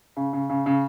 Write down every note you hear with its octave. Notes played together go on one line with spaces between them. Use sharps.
C#3
C#3
C#3
C#3